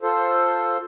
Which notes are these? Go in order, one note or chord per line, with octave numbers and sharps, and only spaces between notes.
F4 A4 C5